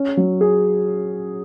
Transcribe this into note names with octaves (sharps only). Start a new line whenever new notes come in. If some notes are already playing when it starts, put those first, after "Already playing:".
Already playing: C#4
F#3
G#4